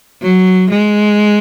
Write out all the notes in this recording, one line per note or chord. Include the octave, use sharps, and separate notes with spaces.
F#3
G#3